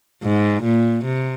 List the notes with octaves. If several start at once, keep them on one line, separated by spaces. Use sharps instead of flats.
G#2
A#2
C3